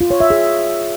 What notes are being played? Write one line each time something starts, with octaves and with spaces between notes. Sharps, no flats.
F4
C#5
E5
G#4